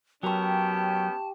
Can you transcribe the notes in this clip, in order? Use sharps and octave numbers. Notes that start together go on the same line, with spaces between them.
F#3 B3 C#4 G4 A#4 G5 A5 C#6